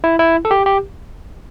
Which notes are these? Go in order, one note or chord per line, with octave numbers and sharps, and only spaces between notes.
E4
E4
A4
G4
G4